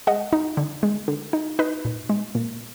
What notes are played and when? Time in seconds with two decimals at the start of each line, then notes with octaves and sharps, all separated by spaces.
0.07 G#3 D#5 F#5
0.33 D#4
0.57 D3
0.83 G#3
1.08 D3
1.33 D#4
1.59 D#4 B4 D#5
1.85 A#2
2.10 G#3
2.35 A#2